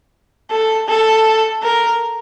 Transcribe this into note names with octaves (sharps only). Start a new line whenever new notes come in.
A4
A4
A#4